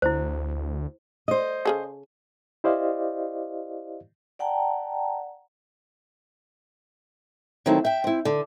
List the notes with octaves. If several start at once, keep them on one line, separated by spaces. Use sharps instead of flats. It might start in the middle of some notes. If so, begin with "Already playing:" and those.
D2 E4 C5
C5 D#5
C#3 G#4 A4
E4 G4 C5 D5 D#5 F5
D5 F#5 G5 A5 A#5
D#3 F#3 A3 C4 E4
E5 G5
C4 E4
D3